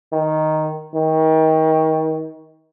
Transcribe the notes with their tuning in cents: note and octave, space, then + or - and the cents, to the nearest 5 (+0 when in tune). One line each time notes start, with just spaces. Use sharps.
D#3 +0
D#3 +30